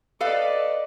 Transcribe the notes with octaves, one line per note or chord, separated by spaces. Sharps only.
A4 B4 D5 D#5 F5